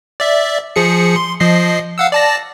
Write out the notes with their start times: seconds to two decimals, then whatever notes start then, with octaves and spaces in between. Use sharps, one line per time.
0.20 D5 E5
0.76 F3 G#4 C#7
1.16 C6
1.40 F3 D#5 C7
1.98 F5 F#5 E6
2.12 D5 A5 A#6